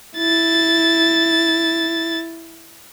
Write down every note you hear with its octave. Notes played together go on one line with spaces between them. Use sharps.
E4 A6